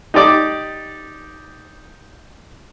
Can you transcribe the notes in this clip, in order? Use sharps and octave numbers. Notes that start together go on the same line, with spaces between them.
D#4 G4 D5 D6